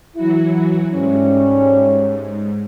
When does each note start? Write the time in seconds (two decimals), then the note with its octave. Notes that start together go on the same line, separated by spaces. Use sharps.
0.16 E3 F#3 E4 F#4
0.93 G#2 G3 A3 C#4